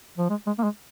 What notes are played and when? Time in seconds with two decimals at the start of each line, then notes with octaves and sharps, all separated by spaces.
0.18 F3
0.30 G#3
0.46 G#3
0.58 A#3
0.63 G#3